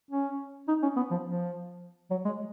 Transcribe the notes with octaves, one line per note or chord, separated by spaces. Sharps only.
C#4
D#4
C#4
B3
F3
F3
F#3
G#3